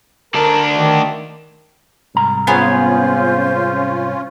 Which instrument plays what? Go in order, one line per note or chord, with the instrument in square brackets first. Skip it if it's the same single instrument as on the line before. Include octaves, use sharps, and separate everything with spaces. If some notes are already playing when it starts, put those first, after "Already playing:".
[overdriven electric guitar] D2 D4 [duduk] A#4
[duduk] D#3
[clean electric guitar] C2 G#2 A#5
[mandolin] B3 G#4 [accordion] C#4 F4 [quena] C5